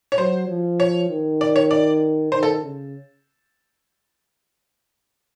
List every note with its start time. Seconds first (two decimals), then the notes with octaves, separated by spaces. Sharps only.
0.12 C#5
0.18 F#3 C5
0.49 F3
0.80 C#5
1.10 D#3
1.41 D5
1.56 C#5
1.71 D5
2.32 D#3 C5
2.43 A4
2.63 C#3